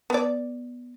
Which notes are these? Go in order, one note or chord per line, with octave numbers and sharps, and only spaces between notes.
B3 D5